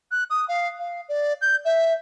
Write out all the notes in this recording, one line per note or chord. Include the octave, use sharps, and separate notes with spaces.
F#6
D#6
F5
F5
D5
G6
E5